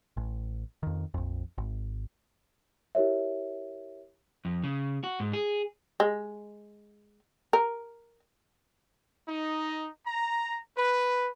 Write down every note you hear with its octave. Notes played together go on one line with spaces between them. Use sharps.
A1
F2 D#3
A#1 F2
G#1
E4 G4 A#4 C#5 E5
F2
C#3
F#4
G#2
G#4
G#3
A#4
D#4
A#5
B4